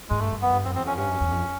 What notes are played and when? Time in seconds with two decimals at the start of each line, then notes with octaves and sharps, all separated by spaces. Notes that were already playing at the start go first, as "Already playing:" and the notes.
0.09 G#2 G#3
0.19 G2 A3
0.31 G2
0.42 F#2 B3
0.53 G2
0.65 F#2 C4
0.75 E2 C4
0.86 F2 C#4
0.97 G2 C#4
1.09 F#2
1.21 E2
1.31 F2